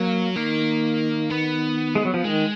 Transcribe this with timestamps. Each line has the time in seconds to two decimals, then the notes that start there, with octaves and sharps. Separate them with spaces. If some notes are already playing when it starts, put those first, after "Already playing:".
Already playing: F#3 A#3
0.36 D#3 A#3
1.30 B3
1.95 G#3
2.05 F#3
2.14 F3
2.24 D#3 G#3